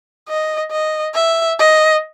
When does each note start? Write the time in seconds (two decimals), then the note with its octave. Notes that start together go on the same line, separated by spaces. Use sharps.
0.29 D#5
0.72 D#5
1.15 E5
1.59 D#5